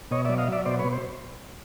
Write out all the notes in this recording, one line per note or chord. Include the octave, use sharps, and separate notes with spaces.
B2 C#5 D#5
F#3 D5 E5
D#5 F5
F#3 D5 E5
B2 C5 D5
B4 C#5
B2
C5